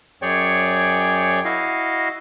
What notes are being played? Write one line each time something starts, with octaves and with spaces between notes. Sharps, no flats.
F#2 G#4 C#5 D5 G5 C#6
E4 F#4 D#5 F5